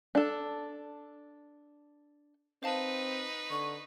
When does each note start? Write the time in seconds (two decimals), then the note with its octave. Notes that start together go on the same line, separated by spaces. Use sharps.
0.15 D4 A4
2.63 C4 D#4 B4 C5 F5 A5
3.50 D3 C#6